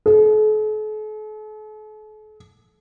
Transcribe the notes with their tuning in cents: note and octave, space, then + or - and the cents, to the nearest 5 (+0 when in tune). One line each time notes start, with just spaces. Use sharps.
A4 -45